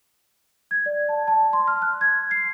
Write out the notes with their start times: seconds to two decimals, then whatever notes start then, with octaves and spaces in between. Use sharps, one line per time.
0.71 G#6
0.86 D5
1.09 A5
1.28 A5
1.53 C6
1.67 F6
1.82 F#6
2.01 G#6
2.31 C7